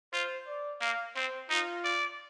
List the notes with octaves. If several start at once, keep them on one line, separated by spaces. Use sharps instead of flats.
F4 C5
D5
A#3 F5
C4 C5
D#4 F4
D5